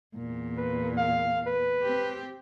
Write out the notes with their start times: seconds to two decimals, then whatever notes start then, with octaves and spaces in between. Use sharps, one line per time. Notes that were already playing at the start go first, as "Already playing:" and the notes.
0.16 E2 A#2
0.57 B4
0.97 F5
1.46 B4
1.82 C4 G4